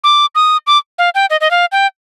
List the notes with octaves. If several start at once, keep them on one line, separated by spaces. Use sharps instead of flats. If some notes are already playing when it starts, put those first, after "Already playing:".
D6
D#6
D6
F5
G5
D#5
D#5
F5
G5